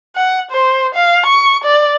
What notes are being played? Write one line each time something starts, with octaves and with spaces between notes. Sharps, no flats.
F#5
C5
F5
C#6
D5